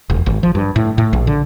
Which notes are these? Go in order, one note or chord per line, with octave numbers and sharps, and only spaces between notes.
E1
G#1
F3
G2
A2
A2
A#1
D3